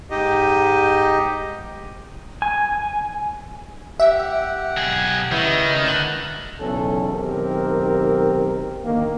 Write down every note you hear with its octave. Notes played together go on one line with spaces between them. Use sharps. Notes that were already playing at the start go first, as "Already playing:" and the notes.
G#2 D#4 G4 D#5
G#5
G4 E5 F#5
B1 G#4
C#2 D#3 E4 B4 C#5 D#5
D4 F#5 E6
B1 E2 C#3 C#4 A4
B1 D#3 C4 G4 A#4
D3 D#3 A#3